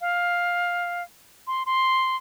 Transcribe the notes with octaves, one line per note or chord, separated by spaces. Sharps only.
F5
C6
C6